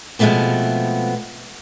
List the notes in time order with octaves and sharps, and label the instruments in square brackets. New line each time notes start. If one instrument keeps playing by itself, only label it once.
[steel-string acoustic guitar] B2 F3 G#3 A3 B3 C4